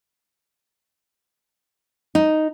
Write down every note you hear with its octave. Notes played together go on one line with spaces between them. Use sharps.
D#4